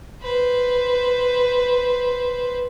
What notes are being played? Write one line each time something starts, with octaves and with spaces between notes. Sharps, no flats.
B4 C5